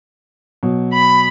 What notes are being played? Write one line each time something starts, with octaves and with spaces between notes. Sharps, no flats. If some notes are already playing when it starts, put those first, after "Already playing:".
B2 F#3
B5